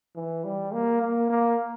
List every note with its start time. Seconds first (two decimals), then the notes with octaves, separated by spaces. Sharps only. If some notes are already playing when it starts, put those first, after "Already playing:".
0.16 E3
0.44 G3
0.73 A#3
1.01 A#3
1.30 A#3